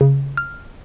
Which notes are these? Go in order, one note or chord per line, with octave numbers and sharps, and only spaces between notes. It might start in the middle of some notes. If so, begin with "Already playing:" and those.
C#3
F6